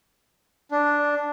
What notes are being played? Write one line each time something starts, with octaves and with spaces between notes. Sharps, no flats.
D4